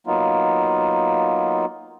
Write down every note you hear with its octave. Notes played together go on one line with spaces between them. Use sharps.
F#3 A#3 B3 D#4 F4